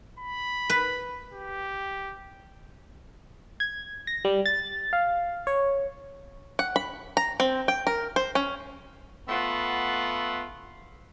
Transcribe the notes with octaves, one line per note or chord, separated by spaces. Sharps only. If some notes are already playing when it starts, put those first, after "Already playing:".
B5
B4
G4
G#6
A#6
G3
A6
F5
C#5
F#5
B5
A#5
C4
G5
A#4
C5
C#4
A3 B3 F4 F#5